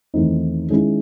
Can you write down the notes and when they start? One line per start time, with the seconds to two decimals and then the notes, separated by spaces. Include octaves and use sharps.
0.14 E2 D#3 A3 C4 D#4
0.69 D#3 G#3 C#4 E4